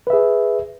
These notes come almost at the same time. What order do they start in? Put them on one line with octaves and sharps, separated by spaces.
B4 E5 G#4